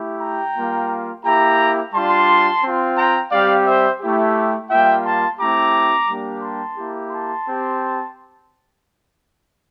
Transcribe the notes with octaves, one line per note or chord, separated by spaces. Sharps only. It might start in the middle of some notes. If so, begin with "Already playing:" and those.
Already playing: A3 E4 G4
G5 A#5
G3 A#3 F4
A#3 E4 G4 G5 A#5
G3 D4 F4 A5 C6
C4 F4
G5 A#5
G3 C4 G4 D5 F5
C5 E5
A3 E4 G4
G3 A#3 F4 E5 G5
A5 C6
A3 C4 E4 G4 A#5 D6
G3 A#3 D4 G4
A5 C6
A#3 E4 G4
A5 C6
C4 G4